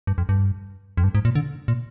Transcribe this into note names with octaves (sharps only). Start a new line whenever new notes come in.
G2
F2
G2
F2
G2
G#2
A#2
D3
A#2